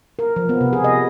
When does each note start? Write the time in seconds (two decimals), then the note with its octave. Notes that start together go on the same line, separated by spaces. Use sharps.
0.19 A#4
0.36 F3
0.49 B3
0.61 C3
0.73 G#4
0.84 D#5